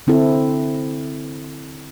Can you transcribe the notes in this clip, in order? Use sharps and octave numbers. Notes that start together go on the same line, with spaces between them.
D3 C4 E4 A4